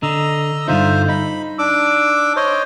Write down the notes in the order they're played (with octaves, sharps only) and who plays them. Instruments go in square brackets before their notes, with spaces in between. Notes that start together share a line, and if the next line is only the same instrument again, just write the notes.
[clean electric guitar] D3 [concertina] D#5 A#5 E6
[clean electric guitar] G2 D3 D#4 [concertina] F4 C5 E5
[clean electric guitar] D#4 [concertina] B5
[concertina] D4 D6 E6
C5 C#5 D#5